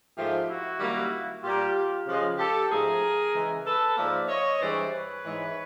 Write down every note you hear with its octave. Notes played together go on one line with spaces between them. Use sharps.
G#2 F3 A3 F4 G4
E4 F#4
F#2 D#3 G3 A#3
A#2 G3 A#3 F4 G4
C#3 F3 G#3
G4 A4
G#2 F3 A3 G#4 A#4
C#3 E3 G#3
A4 B4
G#2 F3 A#3 D5 E5
C#5 D#5
G2 E3 G#3 C5 D5
B4 C#5
G#2 E3 G#3